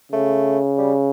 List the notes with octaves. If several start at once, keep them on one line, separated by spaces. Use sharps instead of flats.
C#3 A3
G3